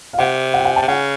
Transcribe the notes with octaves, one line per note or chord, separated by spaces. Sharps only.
F5
C3 F#5
F#5
G5
F#5 G#5
G5 A5
C3
C#3 F#5 G#5